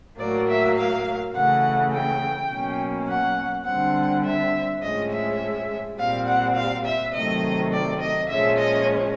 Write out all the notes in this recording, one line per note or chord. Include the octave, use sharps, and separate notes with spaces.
A2 F#3 A#3 D5
E5
F5
C#3 E3 A3 F#5
G5
B2 F#3 A#3 C#4
F#5
D3 G3 C4 F#5
E5
A2 F3 G#3 C#4 D#5
E5
A#2 G3 C4 F5
F#5
F5
E5
C3 D#3 F#3 A3 D#5
D5
D#5
A#2 F3 G#3 C#4 E5
D#5